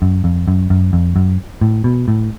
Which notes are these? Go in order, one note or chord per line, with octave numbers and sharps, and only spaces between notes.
F#2
F2
F#2
F#2
F2
F#2
A2
B2
A2